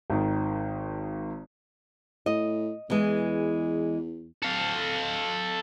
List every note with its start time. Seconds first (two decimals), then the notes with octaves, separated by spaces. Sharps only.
0.10 G#1 D#3
2.26 A2 D#5
2.90 E2 E3 G#3
4.42 A4 F5